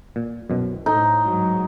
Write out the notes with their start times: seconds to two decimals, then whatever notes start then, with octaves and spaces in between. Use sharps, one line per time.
0.16 A#2
0.50 C2 F#2 B2
0.86 A2 D#4 A4
1.24 G#2 F#3